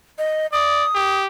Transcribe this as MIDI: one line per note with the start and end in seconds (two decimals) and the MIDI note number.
0.18 0.47 75
0.53 0.86 74
0.53 1.21 87
0.95 1.26 67